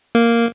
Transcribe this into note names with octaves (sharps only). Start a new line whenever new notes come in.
A#3